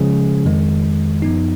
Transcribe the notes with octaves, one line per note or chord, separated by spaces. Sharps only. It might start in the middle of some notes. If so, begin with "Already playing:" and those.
Already playing: C#3 F3 G#3 C#4 G#4
F2 D#3 G#3
F#2 F3 B3 D#4